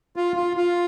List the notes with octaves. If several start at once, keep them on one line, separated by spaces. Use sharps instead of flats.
F4
F4
F4